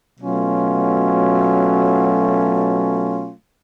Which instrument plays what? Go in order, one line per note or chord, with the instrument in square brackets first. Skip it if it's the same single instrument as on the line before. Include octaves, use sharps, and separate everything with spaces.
[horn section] B2 F#3 A3 C#4 F4